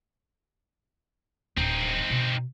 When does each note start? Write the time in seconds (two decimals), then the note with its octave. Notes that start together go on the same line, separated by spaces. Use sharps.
1.57 D1 C4 D4 D#4
2.10 B2